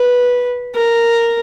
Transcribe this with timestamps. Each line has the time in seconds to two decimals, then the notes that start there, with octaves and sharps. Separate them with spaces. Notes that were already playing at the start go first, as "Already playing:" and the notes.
Already playing: B4
0.75 A#4